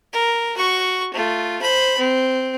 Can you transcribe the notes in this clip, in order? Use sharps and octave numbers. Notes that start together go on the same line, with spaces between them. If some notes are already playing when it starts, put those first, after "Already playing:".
A#4
F#4 C#6
A3 F4
C5 B5
C4